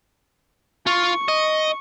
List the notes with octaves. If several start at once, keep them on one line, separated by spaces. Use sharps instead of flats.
F4 C#6
D#5